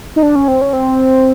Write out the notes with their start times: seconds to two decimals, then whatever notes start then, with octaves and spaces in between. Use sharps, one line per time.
0.16 D#4
0.23 D4
0.35 C#4
0.48 C4
0.61 C#4
0.73 C4